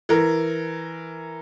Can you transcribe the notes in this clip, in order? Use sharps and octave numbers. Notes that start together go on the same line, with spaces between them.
E3 A#4